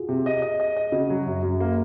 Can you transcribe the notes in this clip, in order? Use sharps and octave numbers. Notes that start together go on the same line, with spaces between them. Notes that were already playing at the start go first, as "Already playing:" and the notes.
Already playing: F4 F#4 G#4
C3
D#5
D#5
D#5
D#5
C#3 F#4
F#3
F#2
F#2
A#3